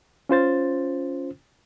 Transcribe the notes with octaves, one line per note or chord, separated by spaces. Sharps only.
C#4 F4 C5 A6